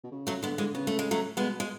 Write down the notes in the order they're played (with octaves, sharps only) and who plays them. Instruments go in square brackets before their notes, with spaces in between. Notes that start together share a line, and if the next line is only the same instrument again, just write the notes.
[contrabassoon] B2
C#3
[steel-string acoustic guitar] F#3 A3
[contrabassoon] D3 [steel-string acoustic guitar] G#3 B3
[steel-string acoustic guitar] E3 G#3
[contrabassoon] C#3 [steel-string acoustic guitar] B3
[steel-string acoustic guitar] A3
G#3
F#3 A3
[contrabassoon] B2 [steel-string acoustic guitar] G#3 B3
[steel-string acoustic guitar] G#3